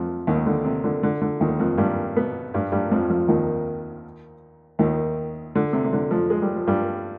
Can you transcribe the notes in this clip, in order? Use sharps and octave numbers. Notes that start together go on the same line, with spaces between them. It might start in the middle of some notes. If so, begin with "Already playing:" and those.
Already playing: F2 F3
D#2 D#3
D3
C3
D3
D3
D3
D#2 D#3
F2 F3
G2 G3
B2 B3
G2 G3
G2 G3
F2 F3
F2 F3
D#2 D#3
D#2 D#3
D3
C3
C3
D3
F2 F3
G#3
G3
F3
G2 G3